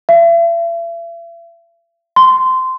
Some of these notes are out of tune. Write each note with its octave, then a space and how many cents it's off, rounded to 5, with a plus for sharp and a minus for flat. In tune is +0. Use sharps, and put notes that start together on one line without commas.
E5 +40
C6 -15